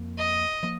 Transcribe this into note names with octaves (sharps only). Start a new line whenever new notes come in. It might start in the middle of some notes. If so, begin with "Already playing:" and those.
Already playing: F2 F3 A#3
D#5
F3 A#3